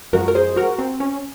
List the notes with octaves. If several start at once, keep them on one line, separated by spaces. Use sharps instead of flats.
F#2 F3 G#3 F#4 A#4
A#4
G#4 C5
F#4 A#4
C4
C#4